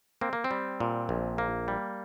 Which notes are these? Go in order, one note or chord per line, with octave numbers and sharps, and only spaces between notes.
A#3 C4
A#3
C4
G3
A#2
A#1
A#3
G3